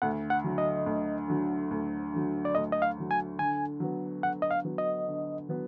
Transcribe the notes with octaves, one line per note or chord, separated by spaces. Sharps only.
D2 F#5
F#5
D3 F#3
D#5
D2
D3 F#3
D2
D3 F#3
D5
D2 D#5
D#5
F5
D3 F#3
G#5
D3 G#5
F#3 B3
D3 F#5
D#5
F5
F#3 B3
D#5
D3
F#3 B3